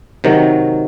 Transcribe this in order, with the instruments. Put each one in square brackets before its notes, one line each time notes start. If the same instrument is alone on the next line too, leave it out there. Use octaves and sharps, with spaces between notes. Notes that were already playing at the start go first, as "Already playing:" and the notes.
[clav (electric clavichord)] C3 D#3 F#3